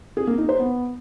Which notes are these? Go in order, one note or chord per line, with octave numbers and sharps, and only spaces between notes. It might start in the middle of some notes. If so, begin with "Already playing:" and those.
G#4
A#3
D#4
C5
B3